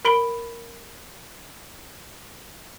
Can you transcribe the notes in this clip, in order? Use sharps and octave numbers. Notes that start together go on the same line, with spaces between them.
A#4 B5 D7 G7